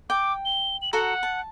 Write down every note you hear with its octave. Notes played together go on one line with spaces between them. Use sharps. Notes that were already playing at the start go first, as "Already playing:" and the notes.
G5 D6
G7
F#7
F#4 A4 F#5 A#5
A5